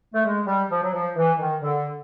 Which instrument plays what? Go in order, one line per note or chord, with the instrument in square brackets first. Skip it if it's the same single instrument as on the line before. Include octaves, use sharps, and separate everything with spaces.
[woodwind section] A3
G#3
G3
F3
F#3
F3
E3
D#3
D3